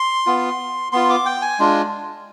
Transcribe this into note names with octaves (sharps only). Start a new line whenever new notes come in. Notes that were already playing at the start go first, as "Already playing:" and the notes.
Already playing: C6
B3 F4
B3 F4 C6
D6
G5
G#5
G#3 D4 F4